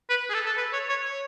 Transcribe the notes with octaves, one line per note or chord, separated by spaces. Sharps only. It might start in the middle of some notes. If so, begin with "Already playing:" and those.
B4
G#4
A4
A4
B4
C#5
C#5
C#5